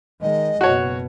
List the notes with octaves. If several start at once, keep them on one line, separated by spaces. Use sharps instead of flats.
D#3 G#3 D#5
F#1 B2 F#4 C#5